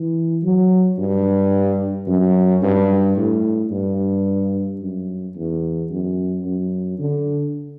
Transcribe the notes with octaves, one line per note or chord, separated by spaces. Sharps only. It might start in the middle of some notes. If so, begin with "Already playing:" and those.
Already playing: E3
F#3
G2
F#2
G2
A2
G2
F#2
E2
F#2
F#2
D3